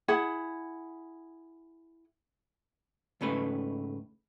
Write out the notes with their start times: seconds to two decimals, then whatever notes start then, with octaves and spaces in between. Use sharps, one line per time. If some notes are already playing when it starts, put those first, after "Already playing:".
0.08 E4 G#4 F#5
3.21 C#2 G#2 C#3 A3 B4